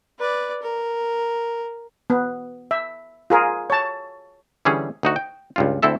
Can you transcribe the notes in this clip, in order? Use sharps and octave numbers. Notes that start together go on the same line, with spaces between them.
B4 D5
A#4
B3
E5
F4 G#4 A#4
C#5 A5
D3 E3 G3 C#4 G#4 C#5
D2 D#4 F#4
G5
C#2 G2 F4
D2 C4 E4 A4 E5